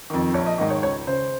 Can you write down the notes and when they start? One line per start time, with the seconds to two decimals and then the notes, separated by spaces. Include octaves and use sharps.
0.10 F2 D#3
0.34 A#1 C#5
0.46 D#5
0.58 G#2 D#3 D#5
0.70 C#5
0.83 C#2 C#5
1.07 C#3 C5